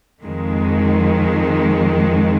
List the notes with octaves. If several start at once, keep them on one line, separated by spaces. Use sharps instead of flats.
F2 D#3 G#3